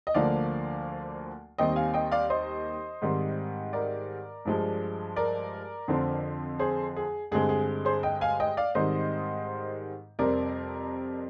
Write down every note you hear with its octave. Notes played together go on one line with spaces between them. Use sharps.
D#5
D2 D3 F3 A#3 D5 F5
D#2 D#3 G3 C4 D#5 G5
F5 G#5
D#5 G5
D5 F5
C5 D#5
G#2 D#3 G3 C4
A#4 D5
G2 F3 G#3
A#4 D5
F2 D3 F3 C4
G#4 C5
G#4
G2 D3 G#3 C4 G#4
G#4
G#4 C5
D#5 G5
F5 G#5
D#5 G5
D5 F5
G#2 D#3 G3 C4 C5 D#5
F2 C3 G3 C4 A#4 D5